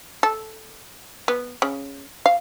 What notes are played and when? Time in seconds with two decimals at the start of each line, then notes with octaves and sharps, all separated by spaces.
0.23 A4
1.28 B3
1.62 C#3
2.26 F5